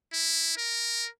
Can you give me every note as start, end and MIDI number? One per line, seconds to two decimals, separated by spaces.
0.13 0.57 64
0.57 1.09 70